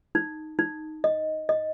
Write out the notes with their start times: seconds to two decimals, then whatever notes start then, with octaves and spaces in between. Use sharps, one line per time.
0.15 D#4
0.59 D#4
1.04 D#5
1.49 D#5